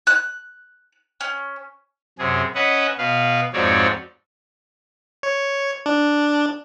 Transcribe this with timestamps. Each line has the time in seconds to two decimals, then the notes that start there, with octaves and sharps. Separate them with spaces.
0.07 F#6
1.21 C#4
2.19 F#2 C3 G#4
2.55 C#4 B4 D#5 E5 F#5
2.98 B2 B4 F5
3.53 F2 G#2 C4 F#4 C#5 D5
5.23 C#5
5.86 D4